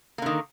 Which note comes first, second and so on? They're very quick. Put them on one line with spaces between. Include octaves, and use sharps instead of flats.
A#3 D3 D#3